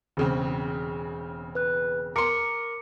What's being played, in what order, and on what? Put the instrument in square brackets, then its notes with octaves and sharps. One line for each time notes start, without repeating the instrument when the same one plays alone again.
[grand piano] E1 C#3 C4
[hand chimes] B4 F#6
[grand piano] A#4 C6 [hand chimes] D6 C#7